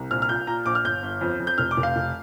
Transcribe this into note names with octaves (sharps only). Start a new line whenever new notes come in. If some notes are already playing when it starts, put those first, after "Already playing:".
Already playing: C2
A#1 F6
F6
A#2 G6
A#2 A#5
A#1 D6
F6
G1 G6
G1
F2
F2
G6
F1 F6
D6
F1
F5
F1